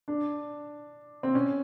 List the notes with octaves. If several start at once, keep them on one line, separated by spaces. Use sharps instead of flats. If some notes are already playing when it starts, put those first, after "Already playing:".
D4
C4
C#4